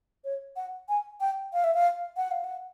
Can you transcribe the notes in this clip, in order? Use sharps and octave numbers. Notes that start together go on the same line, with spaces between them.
C#5
F#5
G#5
G5
F5
E5
F5
F#5
F5
F#5